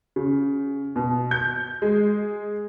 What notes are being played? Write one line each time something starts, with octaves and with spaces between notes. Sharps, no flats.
C#3
B2
G6
G#3